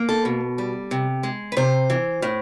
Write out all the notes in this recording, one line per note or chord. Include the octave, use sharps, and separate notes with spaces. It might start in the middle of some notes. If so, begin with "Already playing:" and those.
Already playing: A#3
A4
B2
G3
C3
G#3
B4
C3 C5
E3
A2